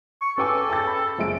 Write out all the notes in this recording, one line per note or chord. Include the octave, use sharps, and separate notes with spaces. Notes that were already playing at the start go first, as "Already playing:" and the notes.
C#6
C#4 A4 B4 G5 G#5 D6 E6
G5 A5 E6 A6
B5
F#1 F3 G#3 C#4 E5 D7